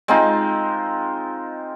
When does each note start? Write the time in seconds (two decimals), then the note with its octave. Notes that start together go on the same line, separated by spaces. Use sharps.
0.08 G#3 C4 D#4 F4